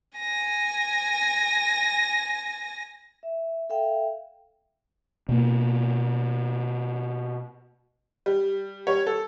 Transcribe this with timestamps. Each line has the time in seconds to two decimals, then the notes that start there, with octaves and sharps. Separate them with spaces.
0.18 G#5 A#6
3.23 E5
3.69 A4 E5 F5 G5
5.29 B2 A#3
8.26 G3
8.87 G3 C#5
9.07 A4